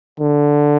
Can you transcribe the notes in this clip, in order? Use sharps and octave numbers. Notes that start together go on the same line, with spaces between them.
D3